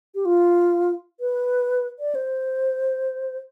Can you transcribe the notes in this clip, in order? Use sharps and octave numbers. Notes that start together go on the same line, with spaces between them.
G4
F4
B4
D5
C5